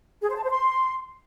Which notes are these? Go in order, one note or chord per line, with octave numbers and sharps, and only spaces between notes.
G#4
C5
A5
C5
C6